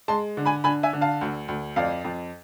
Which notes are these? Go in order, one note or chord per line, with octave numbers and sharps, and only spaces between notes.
G#3 A5 C6
D3
G#5 B5
D3 G#5 B5
E5 G#5
D3
F5 A5
D2
D2
F2 D5 F5
F2